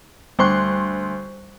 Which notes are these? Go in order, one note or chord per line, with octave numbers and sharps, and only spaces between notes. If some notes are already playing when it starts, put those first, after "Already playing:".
D2 G3 C5 C6 C#6 F#6